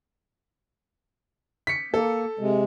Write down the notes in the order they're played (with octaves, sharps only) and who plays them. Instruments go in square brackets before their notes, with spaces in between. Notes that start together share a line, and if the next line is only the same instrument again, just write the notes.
[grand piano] B6 C#7
[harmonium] A#3 [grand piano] A4
[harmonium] C3 G#3